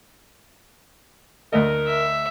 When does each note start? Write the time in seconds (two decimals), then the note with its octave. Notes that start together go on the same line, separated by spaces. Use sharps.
1.53 D2 A3 A#4 D#5
1.87 E5